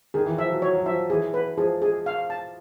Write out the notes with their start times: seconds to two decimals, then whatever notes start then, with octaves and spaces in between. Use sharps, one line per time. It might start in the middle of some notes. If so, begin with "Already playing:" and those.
0.14 D#3 G#4
0.26 E3
0.38 F3 E5
0.50 F#3
0.62 F#3 C#5
0.75 F#3
0.86 F3 E5
1.10 E3 G#4
1.34 B4
1.57 F3 G#4
1.82 G#4
2.06 F5
2.30 A5